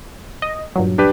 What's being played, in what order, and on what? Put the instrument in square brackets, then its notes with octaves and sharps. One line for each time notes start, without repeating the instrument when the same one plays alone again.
[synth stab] D#5
G2 A#2 F#3
[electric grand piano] D4 G4 B4